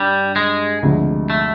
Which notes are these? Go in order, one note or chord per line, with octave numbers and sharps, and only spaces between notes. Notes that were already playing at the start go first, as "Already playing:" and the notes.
Already playing: G2 G3
G#3
D2 C3 F3 G#3
A3